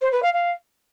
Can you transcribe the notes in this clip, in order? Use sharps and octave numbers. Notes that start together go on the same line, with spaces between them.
C5
B4
F5
F5